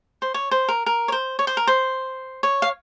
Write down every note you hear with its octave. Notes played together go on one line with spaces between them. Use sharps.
C5
C#5
C5
A#4
A#4
C#5
C5
C#5
C5
A#4
C5
C#5
F5